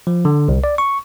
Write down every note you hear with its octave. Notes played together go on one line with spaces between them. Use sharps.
F3
D3
C2
D5
C#6